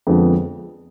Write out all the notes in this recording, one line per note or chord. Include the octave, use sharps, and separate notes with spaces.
F2 D3 F3 G#3 B3